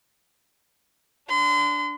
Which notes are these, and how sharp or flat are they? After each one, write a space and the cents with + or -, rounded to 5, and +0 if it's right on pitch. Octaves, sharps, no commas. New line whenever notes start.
D4 -5 C6 -40